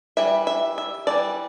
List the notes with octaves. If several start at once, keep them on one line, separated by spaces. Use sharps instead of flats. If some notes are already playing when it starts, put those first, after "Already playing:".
E3 G3 E5
E5
E5
E3 G3 A#3 D4 D5